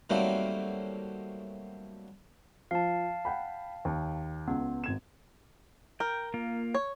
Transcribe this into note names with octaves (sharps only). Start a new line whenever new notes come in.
D#3 F#3 G3 A3 A#3 C4
F3 F5 A5
F#5 G5 B5
D#2
C#2 B3
G#1 G#6 E7
A#4 G5
A#3 F4
C#5